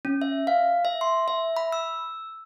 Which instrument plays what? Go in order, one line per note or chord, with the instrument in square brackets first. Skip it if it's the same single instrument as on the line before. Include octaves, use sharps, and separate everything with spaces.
[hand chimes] C#4
E5
F5
E5
C6
E5
B5
E6